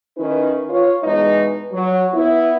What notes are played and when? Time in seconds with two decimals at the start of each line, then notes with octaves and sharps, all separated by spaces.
0.17 D#3 C#4 E4 B4
0.70 F4 C#5
1.03 E2 B2 G#3 D#4 B4
1.71 F#3
2.14 B3 E4